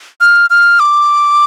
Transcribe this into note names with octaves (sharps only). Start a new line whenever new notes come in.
F6
F6
D6